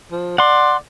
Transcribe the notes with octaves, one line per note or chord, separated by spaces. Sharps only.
F3
D5 F#5 C6